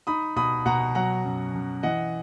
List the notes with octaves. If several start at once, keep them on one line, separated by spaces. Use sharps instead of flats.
D#4 B5 D#6
B2 B5 D#6
B2 F#5 A#5
F#3 F#5 A#5
F#2
F#2
E3 D#5 F#5